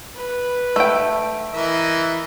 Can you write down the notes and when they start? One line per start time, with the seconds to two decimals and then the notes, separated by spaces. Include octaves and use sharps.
0.15 B4
0.76 A3 G5
1.53 E3 A#4 D#5 E5